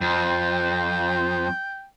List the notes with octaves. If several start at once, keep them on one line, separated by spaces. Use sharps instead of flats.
F2 G5